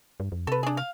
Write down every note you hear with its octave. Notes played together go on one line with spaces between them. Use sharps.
G2
F2
C3 A4 B4
D4 G#4
F5